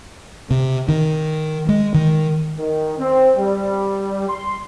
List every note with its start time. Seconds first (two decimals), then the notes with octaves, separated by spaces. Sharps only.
0.51 C3
0.89 D#3
1.69 G#3
1.94 D#3
2.58 D#3
2.99 C4
3.37 G3
4.29 C6